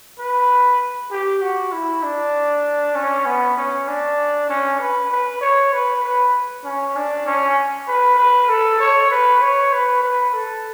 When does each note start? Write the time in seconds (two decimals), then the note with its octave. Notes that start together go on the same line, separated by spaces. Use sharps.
0.19 B4
1.11 G4
1.41 F#4
1.73 E4
2.03 D4
2.95 C#4
3.26 B3
3.57 C#4
3.88 D4
4.50 C#4
4.80 B4
5.12 B4
5.41 C#5
5.73 B4
6.04 B4
6.64 C#4
6.96 D4
7.26 C#4
7.88 B4
8.18 B4
8.49 A4
8.80 C#5
9.11 B4
9.42 C#5
9.73 B4
10.03 B4
10.34 A4